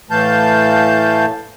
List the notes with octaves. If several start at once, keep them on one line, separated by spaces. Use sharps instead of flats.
A2 E3 A3 F5 A5 G6